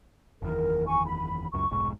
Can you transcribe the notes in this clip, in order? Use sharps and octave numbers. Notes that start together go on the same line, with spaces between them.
F#1 E2 D#3 A#4
G#5 C#6
B5
C#2 F#2 C#6
F1 B1 G#2